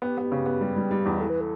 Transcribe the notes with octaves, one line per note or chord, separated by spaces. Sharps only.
B3 G4
B3
C#3
B3
G3
G3
G3
E2
E3 A4
B4
A4